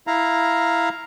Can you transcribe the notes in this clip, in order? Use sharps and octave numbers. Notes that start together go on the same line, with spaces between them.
E4 F5 A#5